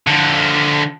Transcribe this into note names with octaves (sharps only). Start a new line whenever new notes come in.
D3 F3